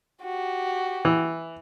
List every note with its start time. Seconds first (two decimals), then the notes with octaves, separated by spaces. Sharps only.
0.23 F#4 G4
1.05 E3